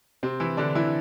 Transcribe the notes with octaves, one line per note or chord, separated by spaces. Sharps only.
C3 C4
E3 E4
D3 D4
E3 E4